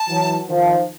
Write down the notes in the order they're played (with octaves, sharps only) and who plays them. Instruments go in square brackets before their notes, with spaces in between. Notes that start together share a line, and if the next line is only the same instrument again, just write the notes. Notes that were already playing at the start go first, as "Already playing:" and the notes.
Already playing: [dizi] A5
[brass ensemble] E3 F#3
D#3 F3